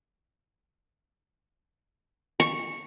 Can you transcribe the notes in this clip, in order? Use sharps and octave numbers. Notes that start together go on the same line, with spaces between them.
C#6